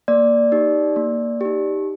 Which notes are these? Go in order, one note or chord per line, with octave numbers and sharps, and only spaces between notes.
A#3 D5
D#4 G4
A#3
D#4 G4